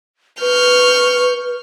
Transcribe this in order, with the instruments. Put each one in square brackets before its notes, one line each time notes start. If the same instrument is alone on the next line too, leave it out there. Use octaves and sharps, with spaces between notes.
[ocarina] B4 [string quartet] C#6 F6 G6